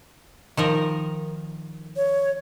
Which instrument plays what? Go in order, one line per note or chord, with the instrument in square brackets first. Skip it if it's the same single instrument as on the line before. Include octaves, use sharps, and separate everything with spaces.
[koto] D#3 F3 A#4
[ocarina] C#5